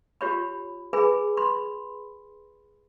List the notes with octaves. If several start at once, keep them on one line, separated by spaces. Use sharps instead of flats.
F4 G4 C#5 B5
G#4 B4 G#5 B5
B5 C6